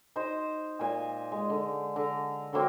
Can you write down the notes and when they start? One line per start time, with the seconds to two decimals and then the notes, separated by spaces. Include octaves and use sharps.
0.16 D#4 C5
0.79 A#2 G#5
1.32 G#3
1.50 D3
1.96 D3 A#5
2.53 D3 F#3 A#3 C4